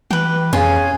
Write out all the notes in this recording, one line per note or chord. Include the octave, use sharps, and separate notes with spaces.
E3 G4 B4
F2 C#4 F4 G#4